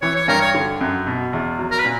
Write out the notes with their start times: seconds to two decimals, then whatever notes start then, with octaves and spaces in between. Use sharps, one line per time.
0.02 E3 C#5
0.16 C#5
0.28 G2 A#4
0.41 C#5
0.54 D3
0.81 F#2
1.07 B2
1.33 E2
1.59 F#3
1.71 A#4
1.79 B4
1.85 A#2